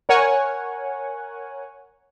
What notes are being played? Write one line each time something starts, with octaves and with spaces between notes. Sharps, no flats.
A#4 C#5 F#5 G#5